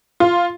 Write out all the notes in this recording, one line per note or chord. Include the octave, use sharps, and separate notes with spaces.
F4